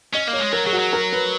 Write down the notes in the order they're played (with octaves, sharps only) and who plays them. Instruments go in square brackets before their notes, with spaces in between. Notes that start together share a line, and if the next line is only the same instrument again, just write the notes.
[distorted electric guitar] C#4 [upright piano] D#5
[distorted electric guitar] A#3
[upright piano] C#5
[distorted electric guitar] G#3
[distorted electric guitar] F#3 [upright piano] A#4
[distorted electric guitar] F#3 [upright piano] G#4
[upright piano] F#4
[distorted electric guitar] F#3
[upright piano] A#4
B4